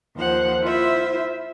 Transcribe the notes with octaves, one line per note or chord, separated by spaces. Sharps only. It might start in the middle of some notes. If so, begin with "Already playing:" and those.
D#2 F3 C5 F#5
E4 F4 C5 E5